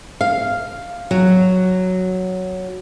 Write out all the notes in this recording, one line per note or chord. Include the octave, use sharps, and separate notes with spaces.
F5
F#3